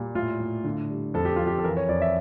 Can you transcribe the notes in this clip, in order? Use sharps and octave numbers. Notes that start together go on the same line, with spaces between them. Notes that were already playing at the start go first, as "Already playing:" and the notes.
Already playing: A#2 G3
A2 F4
A2
D3
G3
F2 A4
G4
F2 F4
G4
A4
E3 A#4
C#5
F2 D5
E5